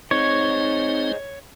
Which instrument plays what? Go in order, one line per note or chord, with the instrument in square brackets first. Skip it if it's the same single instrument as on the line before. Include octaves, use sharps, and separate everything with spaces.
[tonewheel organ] C4 D#4 [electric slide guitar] G#4 C5 D#5 [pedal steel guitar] C#5